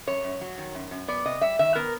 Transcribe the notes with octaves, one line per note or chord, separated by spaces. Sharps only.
F#2 C#5
F#2
F#3
D#3
F#2
F#2
B3 D5
C3 D#5
G3 E5
D#3 E5
B3 A#4